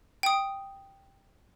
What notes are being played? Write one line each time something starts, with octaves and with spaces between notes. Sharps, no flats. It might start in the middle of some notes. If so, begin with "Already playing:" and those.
G5 D#6